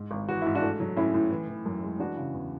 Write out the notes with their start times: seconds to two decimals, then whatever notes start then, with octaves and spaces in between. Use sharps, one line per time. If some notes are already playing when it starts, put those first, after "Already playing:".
Already playing: G#2
0.11 G#1
0.28 E3 F#4
0.42 G#2 E4
0.55 D4 F#4
0.62 A3
0.80 F#3
0.97 A2 C#4 E4
1.14 A2
1.31 E3
1.48 E3
1.66 F#2
1.83 G#3
2.00 E3 D4 F#4
2.17 C#3
2.34 E2